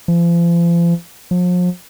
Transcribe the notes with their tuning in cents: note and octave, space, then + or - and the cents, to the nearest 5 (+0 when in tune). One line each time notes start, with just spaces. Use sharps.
F3 -40
F3 +40